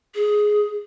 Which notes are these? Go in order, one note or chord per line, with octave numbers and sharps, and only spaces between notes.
G#4